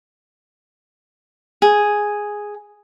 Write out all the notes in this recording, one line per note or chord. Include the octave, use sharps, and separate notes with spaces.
G#4